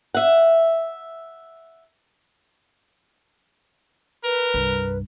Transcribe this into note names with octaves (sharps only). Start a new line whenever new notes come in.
E5 F#5
A#4 B4
C2 G2